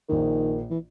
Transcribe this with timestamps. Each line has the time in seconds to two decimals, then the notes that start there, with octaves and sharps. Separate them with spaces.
0.08 A#1 A#2 D#3 A#3
0.70 E3